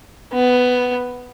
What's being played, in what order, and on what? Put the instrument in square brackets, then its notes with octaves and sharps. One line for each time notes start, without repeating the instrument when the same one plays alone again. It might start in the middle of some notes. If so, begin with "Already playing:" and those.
[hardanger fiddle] B3